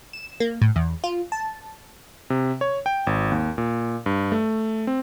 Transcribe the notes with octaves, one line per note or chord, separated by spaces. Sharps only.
E7
A#3
A2
E2
F4
A5
C3
C#5
G5
G#1
D#2
A#2
G2
A3
C4